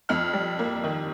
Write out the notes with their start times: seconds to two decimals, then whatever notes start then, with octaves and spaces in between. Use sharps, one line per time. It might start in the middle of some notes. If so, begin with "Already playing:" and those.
0.09 F2 F6
0.33 G3
0.59 A#3
0.84 D#3